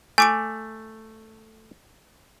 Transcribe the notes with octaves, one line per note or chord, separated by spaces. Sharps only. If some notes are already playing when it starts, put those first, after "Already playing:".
A3 G#5 D6 D7